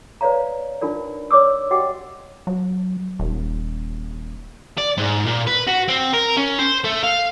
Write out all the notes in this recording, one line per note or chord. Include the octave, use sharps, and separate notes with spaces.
B4 C#5 D5 F5 A#5
D4 D#4 F4 A#4 D5
C#5 D5 D6 E6
F#4 G4 D#5 F#5 G5 D6
F#3
D#1
D5
G#2
A#2
B4
F#4
C4
A#4
C#4
C5
A3
F5